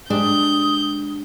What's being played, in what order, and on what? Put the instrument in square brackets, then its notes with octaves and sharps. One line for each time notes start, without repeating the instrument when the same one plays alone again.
[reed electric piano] G#3 G4 [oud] D4 [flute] D#6 [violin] G6